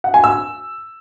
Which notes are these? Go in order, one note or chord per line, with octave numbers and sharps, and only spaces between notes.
F#5
G#5
E6